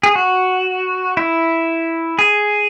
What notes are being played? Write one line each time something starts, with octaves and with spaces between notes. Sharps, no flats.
G#4
F#4
E4
G#4